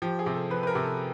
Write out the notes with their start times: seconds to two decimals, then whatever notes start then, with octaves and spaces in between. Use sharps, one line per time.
0.02 F3 G4
0.19 G#4
0.26 C3
0.34 A4
0.50 F3 B4
0.63 B4
0.67 A#4
0.75 C3
0.83 A4